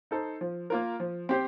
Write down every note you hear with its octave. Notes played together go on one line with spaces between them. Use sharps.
D#4 A4 C5
F3
A#3 F4 A#4
F3
C4 G4 C5